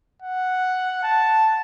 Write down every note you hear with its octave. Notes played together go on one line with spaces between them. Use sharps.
F#5
A5